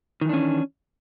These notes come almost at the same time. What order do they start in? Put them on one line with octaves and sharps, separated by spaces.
D#3 E3 D4 C#4